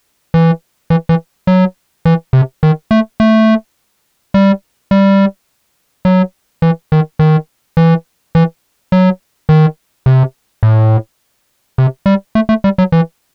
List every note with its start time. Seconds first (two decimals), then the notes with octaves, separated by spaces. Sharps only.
0.34 E3
0.90 E3
1.09 E3
1.47 F#3
2.05 E3
2.33 C3
2.63 D#3
2.91 A3
3.20 A3
4.34 G3
4.91 G3
6.05 F#3
6.62 E3
6.92 D#3
7.19 D#3
7.77 E3
8.35 E3
8.92 F#3
9.49 D#3
10.06 C3
10.63 A2
11.78 C3
12.06 G3
12.35 A3
12.49 A3
12.64 G3
12.78 F#3
12.92 E3